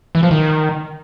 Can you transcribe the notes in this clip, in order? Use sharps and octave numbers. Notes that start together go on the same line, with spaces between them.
E3
F3
D#3